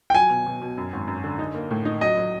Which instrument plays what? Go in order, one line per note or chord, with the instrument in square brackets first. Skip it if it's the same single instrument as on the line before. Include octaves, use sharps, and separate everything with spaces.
[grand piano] G5
[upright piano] F#3 [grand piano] G#5
[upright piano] B2
B2
B2
F#2
G#1
F#2
D3
D#4
A#3
A2
D#4
[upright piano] F#3 [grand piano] D#5
[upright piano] F#3